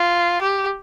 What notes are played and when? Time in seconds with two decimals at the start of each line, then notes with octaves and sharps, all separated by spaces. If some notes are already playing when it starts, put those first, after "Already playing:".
Already playing: F4
0.42 G4